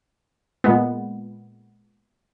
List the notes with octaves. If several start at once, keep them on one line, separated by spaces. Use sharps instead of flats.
A#2 G#3 B3